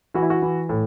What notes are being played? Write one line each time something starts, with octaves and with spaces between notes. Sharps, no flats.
E3 F#4
E4
F#4
E3
A2